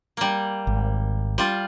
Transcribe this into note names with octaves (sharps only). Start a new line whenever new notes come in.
G3 A#3
G#1
G3 F4